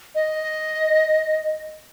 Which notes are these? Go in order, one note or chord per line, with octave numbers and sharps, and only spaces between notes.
D#5